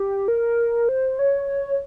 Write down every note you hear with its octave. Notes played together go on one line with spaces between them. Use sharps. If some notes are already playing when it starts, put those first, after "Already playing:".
Already playing: G4
A#4
C5
C#5